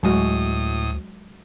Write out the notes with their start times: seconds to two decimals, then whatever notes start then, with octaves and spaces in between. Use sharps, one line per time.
0.03 D2 A2 F#3 G#3 F#4 D#6